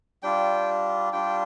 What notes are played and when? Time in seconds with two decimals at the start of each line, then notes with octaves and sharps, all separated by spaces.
0.23 G3 D4 F4 G5
1.13 G3 D4 F4 G5